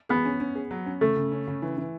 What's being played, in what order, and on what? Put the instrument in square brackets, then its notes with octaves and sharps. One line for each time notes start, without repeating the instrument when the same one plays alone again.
[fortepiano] B3 [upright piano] G#4
[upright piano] C#4
C#4
G#4
F#3
C#4
[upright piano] C#3 [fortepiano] A3
[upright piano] C#3
C#4
C#3
E3
E3